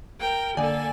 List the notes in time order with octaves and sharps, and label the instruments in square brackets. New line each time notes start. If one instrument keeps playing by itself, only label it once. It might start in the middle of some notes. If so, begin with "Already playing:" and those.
[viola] A#4 G5
[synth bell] D3 D5 G#5 [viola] A#3 A4